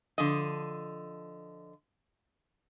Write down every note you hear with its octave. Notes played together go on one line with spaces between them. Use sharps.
D3 F3 D#5